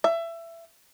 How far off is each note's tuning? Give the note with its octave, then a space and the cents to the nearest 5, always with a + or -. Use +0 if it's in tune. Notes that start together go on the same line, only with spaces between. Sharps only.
E5 +20